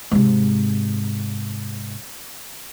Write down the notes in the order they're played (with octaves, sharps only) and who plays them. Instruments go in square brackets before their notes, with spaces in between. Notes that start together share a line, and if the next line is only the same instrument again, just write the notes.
[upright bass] G#2 C3